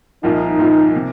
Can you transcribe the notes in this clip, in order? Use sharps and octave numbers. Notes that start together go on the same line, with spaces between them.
C2 A#2 F3 A#3 D#4 F4
C2 A#2 F3 A#3 F4
C3